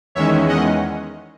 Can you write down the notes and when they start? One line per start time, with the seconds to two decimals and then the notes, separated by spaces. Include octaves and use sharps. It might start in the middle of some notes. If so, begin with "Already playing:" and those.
0.15 E2 D#3 G#3 C#4 C#5 E5
0.48 D#5 F#5